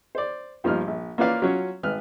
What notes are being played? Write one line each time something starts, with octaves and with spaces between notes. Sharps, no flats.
C5 D5
G2 F3 A#3 D#4 F6
A#1
A#3 C#4 F4 B4 D5 F5
F#3 C#4 F4
G#1 B4 F6